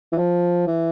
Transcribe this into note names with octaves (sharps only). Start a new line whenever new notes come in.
E3
F3
E3